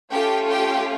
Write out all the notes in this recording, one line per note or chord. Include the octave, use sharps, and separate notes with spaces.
A3 C#4 F4 G4 A4 G5
G4 G5